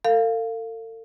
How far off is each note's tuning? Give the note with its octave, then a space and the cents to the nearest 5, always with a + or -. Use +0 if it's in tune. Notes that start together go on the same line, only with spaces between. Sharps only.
A4 +40 F5 +0